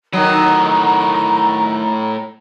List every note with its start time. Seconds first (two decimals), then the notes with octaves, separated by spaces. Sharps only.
0.13 A2 D#3 F#3 D#5 A#5